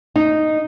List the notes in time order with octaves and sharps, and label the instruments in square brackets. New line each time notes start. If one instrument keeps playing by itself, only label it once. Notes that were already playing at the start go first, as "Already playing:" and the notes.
[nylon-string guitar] D#4